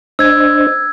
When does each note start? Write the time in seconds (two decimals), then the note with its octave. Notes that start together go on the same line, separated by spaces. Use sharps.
0.19 D4 C5 D#5 E6 G#6